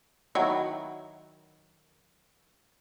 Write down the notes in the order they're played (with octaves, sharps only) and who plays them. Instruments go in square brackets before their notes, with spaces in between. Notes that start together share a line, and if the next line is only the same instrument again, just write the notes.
[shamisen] D#3 F#3 E4